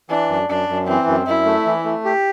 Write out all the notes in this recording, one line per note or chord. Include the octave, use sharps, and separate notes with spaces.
E3 D4
F#2
F#2 D4
F#2
E3 C4
F#2
F#2 E4
A3
E3
A3
G4